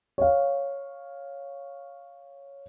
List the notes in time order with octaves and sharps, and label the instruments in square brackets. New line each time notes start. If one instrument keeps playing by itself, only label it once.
[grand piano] C#5 F5